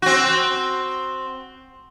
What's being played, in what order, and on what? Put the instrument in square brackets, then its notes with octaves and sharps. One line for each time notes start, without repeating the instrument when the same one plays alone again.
[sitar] C4 F#4